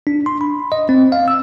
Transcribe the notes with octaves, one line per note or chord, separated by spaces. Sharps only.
D4
C6
B5
D#5
C4
F5
E6